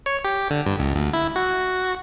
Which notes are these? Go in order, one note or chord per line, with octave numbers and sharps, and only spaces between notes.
C#5
G4
D3
G2
C#2
D2
E4
F#4